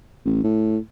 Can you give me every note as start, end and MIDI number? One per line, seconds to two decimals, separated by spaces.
0.25 0.42 33
0.44 0.77 45